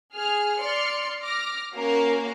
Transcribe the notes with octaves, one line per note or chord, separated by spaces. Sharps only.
G#4 F6
D5 C6 F6 C#7
D6 F6 A#6
A#3 C#4 F#4 A#4 F5